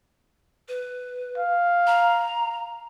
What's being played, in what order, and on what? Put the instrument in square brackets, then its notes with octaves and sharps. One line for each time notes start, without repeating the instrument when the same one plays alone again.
[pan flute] B4
[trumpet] F5
[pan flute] A#5